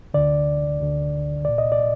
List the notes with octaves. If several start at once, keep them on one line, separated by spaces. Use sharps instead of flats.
D2 D3 D5
D2 D3
C2 A#2 D5
D#5
D5